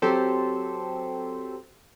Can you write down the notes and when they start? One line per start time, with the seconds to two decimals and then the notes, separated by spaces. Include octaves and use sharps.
0.02 F#3 C4 G4 A4 C5